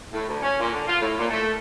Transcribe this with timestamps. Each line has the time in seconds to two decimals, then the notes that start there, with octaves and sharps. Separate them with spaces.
0.13 A2
0.28 D2
0.43 C#4
0.60 A#2
0.72 D3
0.88 F4
1.01 A2
1.19 A#2
1.30 A3